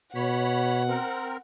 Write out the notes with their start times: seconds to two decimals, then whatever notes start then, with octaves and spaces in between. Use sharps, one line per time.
0.15 B2 C#5 F#5 B5
0.88 C4 A#4